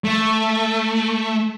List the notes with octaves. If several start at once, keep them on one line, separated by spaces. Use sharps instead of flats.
A3